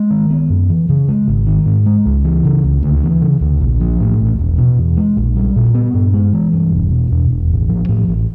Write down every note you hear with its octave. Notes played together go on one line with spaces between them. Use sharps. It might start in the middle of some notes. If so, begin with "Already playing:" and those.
Already playing: G#3
D#3
B3
F#2
E3
C#3
G#3
G#1
D#3
G#2
G#3
C#2
E3
C#3
C#2
D2
E3
C#3
D2
A#1
F3
A2
A#1
E1
B2
E2
G#3
A#1
G3
A#2
B3
G2
G#3
E3
G2
E1
B2
E2
E1
A1
F3
A2
A1